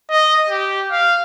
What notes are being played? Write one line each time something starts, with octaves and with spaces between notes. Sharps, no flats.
D#5
G4
F5